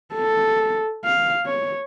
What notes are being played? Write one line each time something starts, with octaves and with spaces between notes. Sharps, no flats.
A4
F5
C#5